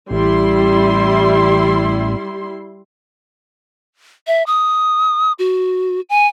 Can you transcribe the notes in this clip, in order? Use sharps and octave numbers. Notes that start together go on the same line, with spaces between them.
A1 G3 E4 C6
E5
D#6
F#4
G#5